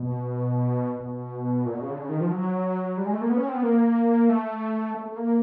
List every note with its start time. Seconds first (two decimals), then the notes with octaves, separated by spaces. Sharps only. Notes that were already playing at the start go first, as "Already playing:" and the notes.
Already playing: B2
1.00 B2
1.66 A#2
1.74 B2
1.82 C#3
1.90 D3
1.99 C#3
2.09 D#3
2.21 F3
2.31 F#3
2.97 G3
3.06 G#3
3.14 A3
3.21 A#3
3.30 B3
3.38 C#4
3.47 C4
3.54 B3
3.63 A#3
4.29 A3
4.95 A3
5.05 A3
5.16 A#3